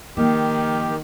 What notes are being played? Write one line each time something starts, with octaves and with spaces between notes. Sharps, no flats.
D#3 F3 A#3 G4